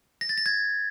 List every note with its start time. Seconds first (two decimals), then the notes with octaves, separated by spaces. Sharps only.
0.21 A#6
0.29 A6
0.38 A#6
0.46 G#6